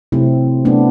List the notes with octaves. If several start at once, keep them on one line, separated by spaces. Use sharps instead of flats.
C3 F#3 A3 C4 E4
C3 F#3 A3 B3 D4